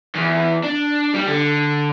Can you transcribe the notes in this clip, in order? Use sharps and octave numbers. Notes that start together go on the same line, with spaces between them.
E2
D4
G3
D3